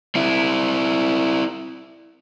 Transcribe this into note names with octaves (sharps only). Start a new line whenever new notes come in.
C4 E4